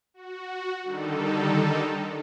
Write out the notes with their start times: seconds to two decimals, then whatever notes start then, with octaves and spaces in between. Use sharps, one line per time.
0.14 F#4
0.83 D3 D#3 G3 D#4 A4